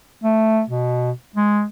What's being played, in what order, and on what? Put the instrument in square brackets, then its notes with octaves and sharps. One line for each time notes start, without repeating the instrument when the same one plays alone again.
[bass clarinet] A3
B2
G#3